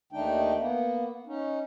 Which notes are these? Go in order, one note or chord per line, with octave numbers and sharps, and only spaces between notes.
D#2 D#3 A3 D4 D#4 G5
A#3 B3
C#4 D#4